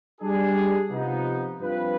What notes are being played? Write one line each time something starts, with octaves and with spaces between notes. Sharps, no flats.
G3 D4 G#4
C3 F3 B3 D#4
G2 F3 C4 F4 B4